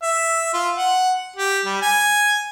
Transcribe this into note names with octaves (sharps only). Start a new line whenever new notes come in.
E5
F4
F#5
G4
G3
G#5